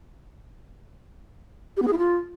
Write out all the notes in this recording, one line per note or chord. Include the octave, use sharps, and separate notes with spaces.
G4
B3
G#4
E4
F4